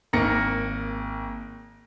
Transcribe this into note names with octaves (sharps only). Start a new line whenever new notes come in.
G#1 A#3 A#4 A#6 C#7